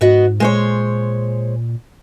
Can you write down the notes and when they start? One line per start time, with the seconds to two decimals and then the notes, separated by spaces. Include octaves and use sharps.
0.01 G#2 B3 F#4 D#5
0.40 A#2 G#3 C5 C#5